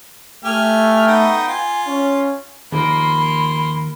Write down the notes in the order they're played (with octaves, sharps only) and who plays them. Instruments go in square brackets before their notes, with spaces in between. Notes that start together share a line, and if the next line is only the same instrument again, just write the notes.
[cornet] A3 [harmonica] G4 G#5 F6
[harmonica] B3 D#4 G5
[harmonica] F4 [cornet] G#5
[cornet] C#4
[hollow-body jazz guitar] D#2 F3 [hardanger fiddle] A#3 C6 [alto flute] B5